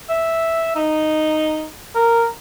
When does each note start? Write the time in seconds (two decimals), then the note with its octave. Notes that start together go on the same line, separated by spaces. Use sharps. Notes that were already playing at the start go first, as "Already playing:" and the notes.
0.09 E5
0.76 D#4
1.95 A#4